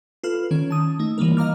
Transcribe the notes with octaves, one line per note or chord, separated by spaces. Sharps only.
F4 A4 B4 F6
D#3 C#4 C#5
A5 D#6
A3 D#4
E3 G3 A#3 A#4
D#5 F5 A#5 D6 F6